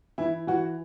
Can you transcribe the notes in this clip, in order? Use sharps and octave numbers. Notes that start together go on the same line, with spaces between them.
E3 E4
E3 F#4